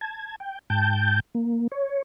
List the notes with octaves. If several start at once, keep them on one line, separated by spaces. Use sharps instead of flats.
A5 G#6
G5
G#2 G5 A5 G6
A#3
C#5